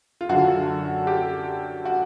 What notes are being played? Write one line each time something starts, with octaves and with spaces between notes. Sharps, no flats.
F4
F#2 D3 F#4
G4
F#4